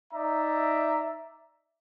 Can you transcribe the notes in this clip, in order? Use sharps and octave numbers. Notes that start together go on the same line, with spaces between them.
D#4 D5 E5 A#5